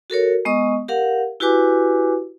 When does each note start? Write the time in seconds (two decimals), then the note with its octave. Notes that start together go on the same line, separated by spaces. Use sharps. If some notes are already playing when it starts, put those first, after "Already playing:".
0.10 F#4 A4 A#4 C#5
0.45 G#3 B3 D#5 C#6 D#6
0.88 G4 A#4 F5 F#5
1.40 E4 F#4 G4 B4 G#5 D6